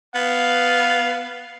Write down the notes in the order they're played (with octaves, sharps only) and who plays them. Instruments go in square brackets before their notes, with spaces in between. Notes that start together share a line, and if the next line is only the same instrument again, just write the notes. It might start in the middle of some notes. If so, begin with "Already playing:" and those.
[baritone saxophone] B3 [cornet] F5